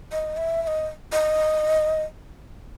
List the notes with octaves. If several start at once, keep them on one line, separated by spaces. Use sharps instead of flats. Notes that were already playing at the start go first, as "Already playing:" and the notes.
D#5
E5
E5
D#5
D#5